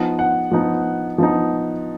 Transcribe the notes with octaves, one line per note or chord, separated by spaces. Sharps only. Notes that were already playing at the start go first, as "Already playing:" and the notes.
Already playing: F3 B3 D#4
F#5
F3 B3 D#4
F3 B3 D#4